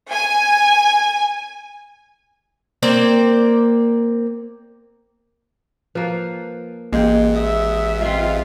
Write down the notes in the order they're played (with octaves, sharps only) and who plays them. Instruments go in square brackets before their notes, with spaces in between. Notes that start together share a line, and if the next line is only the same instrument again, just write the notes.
[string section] G#5
[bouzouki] A#3 C4 D5 G5
[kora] F3 A#3 [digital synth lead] B4
[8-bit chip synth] A1 [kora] G#3 G5 [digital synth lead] A#3
[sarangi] E5 [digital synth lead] D#6
[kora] G#3 C4 [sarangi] F4 [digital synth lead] E5